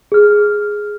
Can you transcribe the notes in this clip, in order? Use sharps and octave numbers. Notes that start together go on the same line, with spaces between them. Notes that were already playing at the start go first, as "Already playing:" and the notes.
G#4 F6